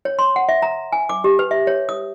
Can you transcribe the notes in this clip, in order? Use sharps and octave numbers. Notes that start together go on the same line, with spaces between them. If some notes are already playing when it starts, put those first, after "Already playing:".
C#5
C6
F#5
E5
A#5
G#5
D6
G4
B4
E5
C#5
D#6